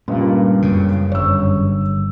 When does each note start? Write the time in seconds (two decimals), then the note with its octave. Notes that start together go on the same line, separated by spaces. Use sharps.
0.08 C#2 G2 A#2 G3
0.62 F#2 C#3
1.12 G1 G2 C#5 E6